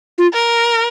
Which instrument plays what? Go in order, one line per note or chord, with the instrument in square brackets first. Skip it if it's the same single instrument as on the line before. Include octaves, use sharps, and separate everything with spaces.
[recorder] F4
[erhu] A#4